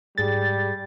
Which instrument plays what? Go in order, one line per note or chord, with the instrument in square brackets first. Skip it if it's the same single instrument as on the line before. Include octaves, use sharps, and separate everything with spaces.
[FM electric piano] G#2 G#4 A6 [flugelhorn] G3